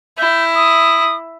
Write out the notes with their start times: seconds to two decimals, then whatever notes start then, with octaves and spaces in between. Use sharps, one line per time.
0.18 E4 G6
0.55 D#6